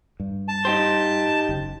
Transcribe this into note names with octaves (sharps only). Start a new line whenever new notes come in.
G2
A5
D#4 G4 C5
F#1